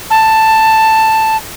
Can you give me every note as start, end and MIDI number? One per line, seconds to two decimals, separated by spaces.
0.10 1.37 81